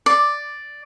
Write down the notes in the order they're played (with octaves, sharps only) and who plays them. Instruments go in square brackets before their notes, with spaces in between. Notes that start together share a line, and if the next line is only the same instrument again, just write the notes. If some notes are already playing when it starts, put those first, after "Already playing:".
[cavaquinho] D5